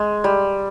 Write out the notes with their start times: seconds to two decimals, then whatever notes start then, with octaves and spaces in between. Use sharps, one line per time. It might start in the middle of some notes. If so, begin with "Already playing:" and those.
Already playing: G#3
0.24 G3